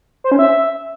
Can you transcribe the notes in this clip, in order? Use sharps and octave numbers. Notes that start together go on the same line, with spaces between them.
C5
C#4
E5